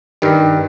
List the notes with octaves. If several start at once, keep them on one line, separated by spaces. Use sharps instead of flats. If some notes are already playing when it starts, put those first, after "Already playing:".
G2 D#3 G3